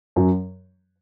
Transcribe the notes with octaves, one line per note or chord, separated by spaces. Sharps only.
F#2 F#3